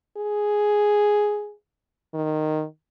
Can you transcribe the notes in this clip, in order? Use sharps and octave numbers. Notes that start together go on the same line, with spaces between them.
G#4
D#3